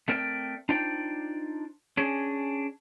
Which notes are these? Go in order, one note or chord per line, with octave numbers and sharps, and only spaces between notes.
A3 C4 A#4 D5 G5
D4 D#4 F4 C5 D5 G5
C#4 D4 G#4